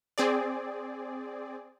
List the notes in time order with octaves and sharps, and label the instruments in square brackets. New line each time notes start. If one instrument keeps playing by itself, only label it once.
[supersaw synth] C4 G#4 D5